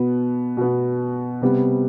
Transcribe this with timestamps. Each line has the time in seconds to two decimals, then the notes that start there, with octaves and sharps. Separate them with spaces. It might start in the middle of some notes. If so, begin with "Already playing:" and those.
Already playing: B2 B3
0.57 B2 B3
1.42 C3 G3 B3